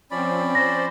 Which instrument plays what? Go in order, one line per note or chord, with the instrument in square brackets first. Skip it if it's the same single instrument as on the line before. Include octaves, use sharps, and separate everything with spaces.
[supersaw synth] F3 C4 [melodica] C#4 D5 B5
[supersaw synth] C5 [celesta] A#6